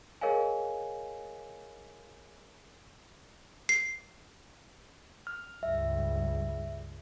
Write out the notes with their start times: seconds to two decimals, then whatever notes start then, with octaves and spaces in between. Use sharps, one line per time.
0.21 G#4 A#4 C#5 D#5 F5 G#5
3.69 C7
5.27 F6
5.63 C#2 G2 E5